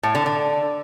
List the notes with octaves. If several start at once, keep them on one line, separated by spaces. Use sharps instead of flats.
A2
D3
D3